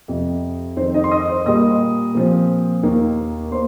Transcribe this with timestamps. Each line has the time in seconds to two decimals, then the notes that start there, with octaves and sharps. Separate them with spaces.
0.08 F2 C3 F3
0.77 F2 D#3 C4 C5
0.94 D#4 D#5
1.04 C6
1.11 D#5 D#6
1.29 C5 C6
1.46 A#2 G3 A#3 D#5 D#6
2.15 A#2 F3 C4
2.83 D#2 D#3 A#3
3.51 A#3 C5 C6